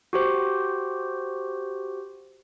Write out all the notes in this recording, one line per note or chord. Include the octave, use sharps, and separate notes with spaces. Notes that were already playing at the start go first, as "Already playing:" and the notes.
F#4 G4 C5